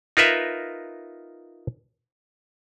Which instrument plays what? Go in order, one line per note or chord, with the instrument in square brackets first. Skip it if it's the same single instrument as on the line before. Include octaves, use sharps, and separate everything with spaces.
[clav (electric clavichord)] D#4 F4 A#4 B4 E5